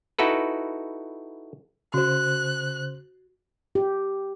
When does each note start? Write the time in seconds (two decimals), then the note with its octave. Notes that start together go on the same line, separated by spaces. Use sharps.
0.19 D#4 E4 F#4 A4 B4
1.94 C#3 F#4 C5 F#6
3.75 G4